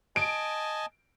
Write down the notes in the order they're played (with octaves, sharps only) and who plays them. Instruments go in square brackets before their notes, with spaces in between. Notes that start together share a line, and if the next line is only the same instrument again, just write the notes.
[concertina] D#5 G#5 A5 [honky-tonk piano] D7